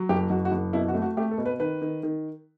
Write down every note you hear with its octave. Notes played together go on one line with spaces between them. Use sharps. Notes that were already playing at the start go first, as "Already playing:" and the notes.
Already playing: F#3
F#1 G4
F#1 F#4
F#4
F#1
B2 E4
F#4
A3
F#4
A3 G4
A4
B2
B4
D#3 B4
D#3
D#3